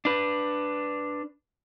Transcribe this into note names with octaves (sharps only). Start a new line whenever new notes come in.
D4 B4